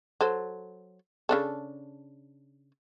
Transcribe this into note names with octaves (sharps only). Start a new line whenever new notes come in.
F#3 A4 C5
C#3 D4 A4